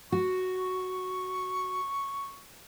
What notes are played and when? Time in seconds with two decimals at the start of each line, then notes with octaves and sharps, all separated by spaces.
0.12 F#4 C#6